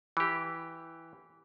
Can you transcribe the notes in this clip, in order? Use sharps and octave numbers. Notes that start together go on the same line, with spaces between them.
E3 G4